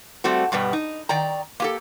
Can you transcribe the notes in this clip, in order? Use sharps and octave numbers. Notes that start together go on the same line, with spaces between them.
G3 A3 C4 F#4
G2 B2 G3 B3
D#4
D#3 D5 G5 A#5
A#3 G4 A4